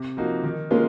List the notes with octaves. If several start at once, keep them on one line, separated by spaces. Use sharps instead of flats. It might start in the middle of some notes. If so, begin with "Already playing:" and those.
Already playing: C3
F3 A#3 D#4 F#4
D#3
G#3 A#3 C#4 F4